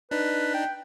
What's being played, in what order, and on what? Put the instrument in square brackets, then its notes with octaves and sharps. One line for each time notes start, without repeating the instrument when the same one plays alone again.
[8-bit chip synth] D4 D#4 [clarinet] B4
[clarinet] G5